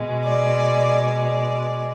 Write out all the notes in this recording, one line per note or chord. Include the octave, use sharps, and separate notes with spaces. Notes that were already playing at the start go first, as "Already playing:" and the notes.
Already playing: B2 G#3
D5
D5